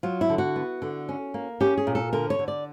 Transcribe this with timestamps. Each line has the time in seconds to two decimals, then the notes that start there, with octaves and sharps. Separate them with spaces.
0.03 F#3 F4
0.21 E4
0.30 D3
0.38 F#4
0.56 B3
0.82 D3
1.09 C#4
1.34 A#3
1.61 C#4 G4
1.78 G#4
1.87 A#2
1.95 A4
2.13 D3 A#4
2.30 C#5
2.39 D3
2.48 D5